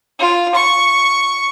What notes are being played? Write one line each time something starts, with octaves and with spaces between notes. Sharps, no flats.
F4
C#6